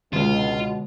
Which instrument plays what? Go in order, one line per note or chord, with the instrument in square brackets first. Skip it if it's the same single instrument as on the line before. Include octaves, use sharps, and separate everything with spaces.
[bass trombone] C#2 [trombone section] B2 [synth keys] D3 G#3 C#5 [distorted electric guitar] F4